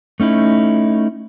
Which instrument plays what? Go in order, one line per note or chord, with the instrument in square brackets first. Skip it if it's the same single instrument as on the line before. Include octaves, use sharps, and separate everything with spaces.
[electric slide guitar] A3 C#4 D#4 E4